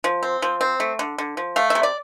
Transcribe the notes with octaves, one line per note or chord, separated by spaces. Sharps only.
F3
C4
F3
C4
A3
D3
D3
F3
A3 F5
C3 E5
D5